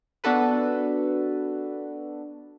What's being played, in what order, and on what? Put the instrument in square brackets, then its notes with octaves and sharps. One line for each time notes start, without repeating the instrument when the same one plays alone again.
[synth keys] B3 D4 F#4 A4 B4